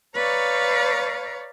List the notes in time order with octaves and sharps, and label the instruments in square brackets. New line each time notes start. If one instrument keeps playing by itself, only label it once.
[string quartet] B4 C#5 D5 F5 A#5 C#6